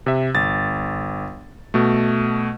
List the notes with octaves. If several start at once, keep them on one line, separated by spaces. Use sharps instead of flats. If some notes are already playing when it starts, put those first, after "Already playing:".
C3 E5
G1 A6
B2 A3